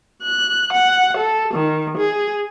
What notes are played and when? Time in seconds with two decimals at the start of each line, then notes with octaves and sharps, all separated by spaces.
0.23 F#6
0.72 F#5
1.17 A4
1.54 D#3
1.97 G#4